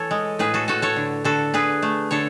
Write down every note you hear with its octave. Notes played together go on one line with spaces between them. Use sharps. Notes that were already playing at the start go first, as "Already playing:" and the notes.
Already playing: E3 A4 C#5
G#3
A2 G#4 B4
F#4 A4
A2 F#4 A4
A4 C#5
D3
D3 F#4 A4
D3 G#4 B4
A3
D3 A4 C#5